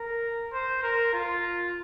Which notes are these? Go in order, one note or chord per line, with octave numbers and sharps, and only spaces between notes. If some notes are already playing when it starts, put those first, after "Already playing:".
Already playing: A#4
C5
A#4
F4